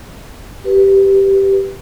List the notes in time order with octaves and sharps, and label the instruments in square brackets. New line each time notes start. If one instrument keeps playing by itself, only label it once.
[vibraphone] G4 B4